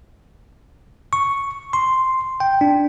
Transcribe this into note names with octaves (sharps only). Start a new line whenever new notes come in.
C#6
C6
G5
D4